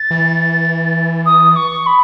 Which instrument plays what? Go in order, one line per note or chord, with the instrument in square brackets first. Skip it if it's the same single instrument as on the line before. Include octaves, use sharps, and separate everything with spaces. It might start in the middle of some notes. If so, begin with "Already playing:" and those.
Already playing: [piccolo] A6
[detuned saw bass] E3
[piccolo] D#6
C#6
B5